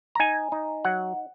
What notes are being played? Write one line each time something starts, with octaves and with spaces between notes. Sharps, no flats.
A#5
D#4 G#5
D#4
F#3 F#5